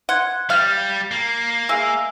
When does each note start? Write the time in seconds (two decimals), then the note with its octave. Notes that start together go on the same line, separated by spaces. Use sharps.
0.09 F#5 C6 G#6
0.50 G3 F5
1.11 A#3
1.69 G#3 E5 F5 G#5 E6